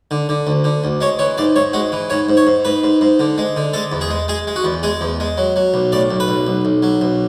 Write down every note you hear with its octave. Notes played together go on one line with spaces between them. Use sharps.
D3
D3
D2
D3
D2
G#3 C#5
E3 C#5
G#2 D5
G#2 C#5
G#3 F#4
E3
G#2 C#5
G#2
C#5
G#2
G#2 B4
G#2
G#2
D3
G#3
D3
G#3 A4
E2
G#4
G#3
G#3 G#4
G#3
F#4
E2
G#3 G#4
E2
G#3
F#3
F#3
B1
A2 D5
B1
B4
B1
B1
B1
F#3
B1